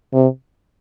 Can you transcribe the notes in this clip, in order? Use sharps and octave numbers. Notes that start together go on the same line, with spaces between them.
C3